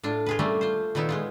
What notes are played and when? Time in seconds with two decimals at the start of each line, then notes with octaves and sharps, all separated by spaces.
0.03 A2 D4 F4
0.26 F4 G#4 B4
0.39 G3 A3 A#3 C#4 F4
0.61 F4 C5
0.95 A#2 D#3 B3 D#4 E4
1.09 G#3 B3 F4